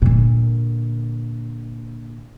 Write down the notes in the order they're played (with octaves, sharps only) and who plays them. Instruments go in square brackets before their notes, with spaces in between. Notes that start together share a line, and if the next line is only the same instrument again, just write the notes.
[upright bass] A#2 D3